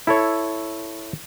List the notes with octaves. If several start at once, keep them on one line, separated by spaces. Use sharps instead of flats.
E4 A4 C#5